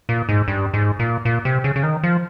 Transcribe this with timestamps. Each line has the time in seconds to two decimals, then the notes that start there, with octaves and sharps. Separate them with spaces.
0.09 A#2
0.29 G#2
0.48 G2
0.74 G#2
0.99 A#2
1.25 A#2
1.45 C3
1.64 C#3
1.76 C#3
1.83 D#3
2.03 F3